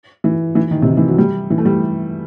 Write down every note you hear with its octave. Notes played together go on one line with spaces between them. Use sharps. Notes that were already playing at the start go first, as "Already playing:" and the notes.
E3
E3
D#3
C3
D#3
E3
F#3
G3
E3
A3
G3